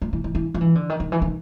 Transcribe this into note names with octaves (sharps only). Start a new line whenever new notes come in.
F3
E3
E3
E3
F3
E3
D3
D#3
D#3
E3
D#3